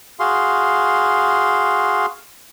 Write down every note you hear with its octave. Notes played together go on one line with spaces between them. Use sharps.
F#4 G#4 F5 C6